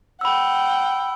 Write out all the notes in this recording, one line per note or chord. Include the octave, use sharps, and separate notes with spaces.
F#5 G5 B5 E6